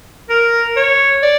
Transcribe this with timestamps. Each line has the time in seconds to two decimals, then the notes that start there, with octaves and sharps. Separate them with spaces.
0.30 A#4
0.76 C#5
1.23 D5